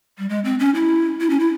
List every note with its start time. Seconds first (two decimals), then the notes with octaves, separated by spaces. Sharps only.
0.18 G3
0.29 G#3
0.45 C4
0.59 C#4
0.75 E4
1.21 E4
1.30 C#4
1.40 E4